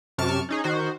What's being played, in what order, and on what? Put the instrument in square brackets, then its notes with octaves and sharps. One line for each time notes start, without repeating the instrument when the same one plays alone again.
[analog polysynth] F#2 C3 A5 C#6 F6 D7
C#4 D#4 G#4
D#3 F#4 C5